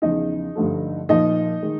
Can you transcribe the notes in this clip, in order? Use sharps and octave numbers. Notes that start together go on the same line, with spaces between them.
E2 C#3 F3 D#4 D#5
G2 D3 F3 A3
A#2 F3 A#3 D#4 D#5
D#3 G#3